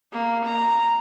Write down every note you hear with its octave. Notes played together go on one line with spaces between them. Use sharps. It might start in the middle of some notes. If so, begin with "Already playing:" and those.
A#3
A#5